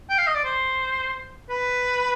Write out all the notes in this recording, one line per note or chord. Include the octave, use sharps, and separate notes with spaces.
G5
F5
D#5
D5
C5
B4